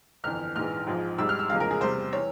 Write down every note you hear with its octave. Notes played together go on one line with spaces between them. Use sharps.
G1 F2 E3 F6
A#1 G#2 E3 F6
G#1 G#2 F3 G#3
G#1 G#2 G3 E6
F6
E6
F1 E2 C#3 F3 G#3 F5
A#4
G#4
E2 C3 G3 C5
E3 C#5